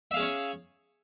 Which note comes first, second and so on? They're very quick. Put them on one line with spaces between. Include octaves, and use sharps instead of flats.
E5 F5 G#4 C#4 C#5